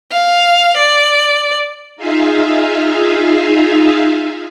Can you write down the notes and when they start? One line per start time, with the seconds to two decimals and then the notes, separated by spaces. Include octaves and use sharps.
0.12 F5
0.76 D5
1.96 D#4 F4 G#4 E5 F5